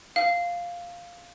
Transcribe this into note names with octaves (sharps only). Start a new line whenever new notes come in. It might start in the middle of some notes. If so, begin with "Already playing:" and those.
F5